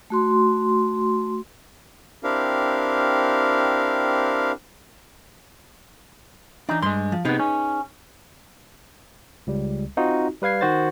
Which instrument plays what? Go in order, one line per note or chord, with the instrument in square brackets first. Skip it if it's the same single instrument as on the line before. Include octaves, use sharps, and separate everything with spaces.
[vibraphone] A3 F#4 C6
[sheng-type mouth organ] C4 D4 E4 G4 A#4 F5
[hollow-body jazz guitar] E3 D4 [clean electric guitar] D#4
[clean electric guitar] G2 G#3 [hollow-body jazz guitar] C6
[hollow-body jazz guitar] F3
[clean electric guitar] C3 B3 [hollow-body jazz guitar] D#4 G#4 B4
[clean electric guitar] C#4
[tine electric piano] C#2 G3
C4 D#4 F4 F#4
G3 B4 F5 G#6 C7
D#3 F#4 C5 A6